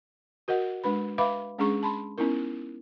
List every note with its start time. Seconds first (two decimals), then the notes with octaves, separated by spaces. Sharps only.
0.48 F#4 A#4 D#5 F#5
0.84 G#3 D4 B4 B5
1.18 B4 E5 F5 B5 D6
1.58 G#3 C#4 D4 G#4 A#5 C#6
1.83 A5 B5 C6
2.18 B3 C#4 D#4 E4 A#4